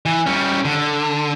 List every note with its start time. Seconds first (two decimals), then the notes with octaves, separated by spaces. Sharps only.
0.06 E3
0.26 G3 C#4
0.65 D3